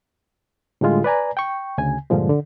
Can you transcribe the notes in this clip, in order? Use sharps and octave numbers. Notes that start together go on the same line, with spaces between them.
A2 D3 G3 G#3 F4
B4 D5 G#5 A#5
G5 C#6
D2 C#3 G#5
G2 A#2 D3 F3 G#3
D3